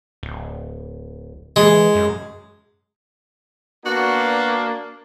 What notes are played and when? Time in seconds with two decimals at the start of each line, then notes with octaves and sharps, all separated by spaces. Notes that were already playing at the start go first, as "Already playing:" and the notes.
0.23 D1
1.56 E3 G#3
1.95 F#2
3.86 A#3 B3 D4 F#4